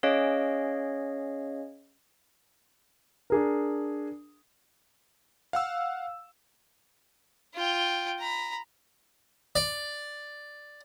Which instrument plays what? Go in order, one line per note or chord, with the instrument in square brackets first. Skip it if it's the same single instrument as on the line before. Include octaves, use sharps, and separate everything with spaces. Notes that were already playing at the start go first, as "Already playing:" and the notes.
[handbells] C#4 G#4 C#5 D#5 F5
[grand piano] D4 G#4 A#4
[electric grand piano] F5 F#5 E6
[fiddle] F4 G5
A#5 B5
[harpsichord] D5